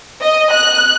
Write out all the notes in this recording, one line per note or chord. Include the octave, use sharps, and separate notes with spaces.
D#5
F#6